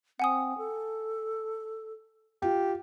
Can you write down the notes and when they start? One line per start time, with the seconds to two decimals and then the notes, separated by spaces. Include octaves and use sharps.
0.20 C4 F#5 G#5 D#6
0.58 A4
2.42 F4 G4